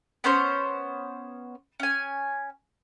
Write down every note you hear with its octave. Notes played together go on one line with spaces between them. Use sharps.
B3 C#4 C5 C#5
C#4 G#5